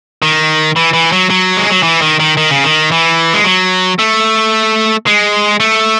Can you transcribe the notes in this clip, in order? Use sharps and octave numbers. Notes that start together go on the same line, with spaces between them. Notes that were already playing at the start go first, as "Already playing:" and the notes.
D#3
E3
E3
F#3
F#3
G#3
F#3
E3
D#3
D#3
D#3
C#3
D#3
E3
G#3
F#3
A3
G#3
A3